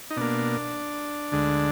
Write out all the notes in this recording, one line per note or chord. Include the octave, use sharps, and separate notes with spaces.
D#4
B2 A#3 D4
D2 D3 G#3